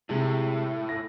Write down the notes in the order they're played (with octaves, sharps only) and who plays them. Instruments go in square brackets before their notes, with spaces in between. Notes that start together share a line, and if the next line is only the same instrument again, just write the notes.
[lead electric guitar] A2 [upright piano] C3 G#3
[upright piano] A#6